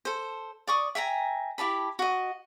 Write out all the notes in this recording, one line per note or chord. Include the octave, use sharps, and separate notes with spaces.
A4 C5
D5 C#6 D#6
E5 G5 G#5 A#5
E4 G4 A5 B5
F#4 D#5